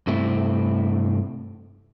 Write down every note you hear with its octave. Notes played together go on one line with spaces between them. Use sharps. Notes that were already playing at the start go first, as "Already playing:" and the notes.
G2 C3 A3 C4 E4